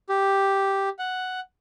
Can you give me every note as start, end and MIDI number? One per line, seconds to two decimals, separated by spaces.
0.09 0.89 67
0.99 1.40 78